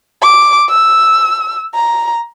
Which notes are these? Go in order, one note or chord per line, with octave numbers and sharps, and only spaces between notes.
D6
E6
A#5